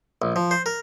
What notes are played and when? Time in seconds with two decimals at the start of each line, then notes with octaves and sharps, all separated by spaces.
0.22 A#1
0.36 F3
0.51 C5
0.66 A#4